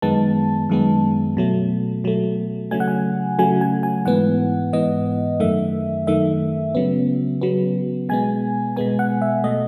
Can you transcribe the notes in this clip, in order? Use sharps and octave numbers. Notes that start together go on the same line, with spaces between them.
F#2 D#3 G#3 B3 A5
F#2 D#3 G#3 B3
B2 F#3 A3
B2 F#3 A3
C#3 F#3 A3 G#5
F#5
G#5
C#3 F#3 A3 G#5
G#5
G#5
G#2 E3 B3 F#5
G#2 E3 B3 D#5
F#2 D#3 A3 E5
F#2 D#3 A3 E5
C#3 F#3 B3
C#3 F#3 B3
B2 G#3 B3 G#5
B2 G#3 B3 G#5
F#5
E5
B2 A3 D#5